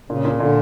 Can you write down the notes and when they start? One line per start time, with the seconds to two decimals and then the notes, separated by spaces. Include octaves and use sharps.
0.09 A#2 C#3
0.25 A#2
0.40 A#2 D3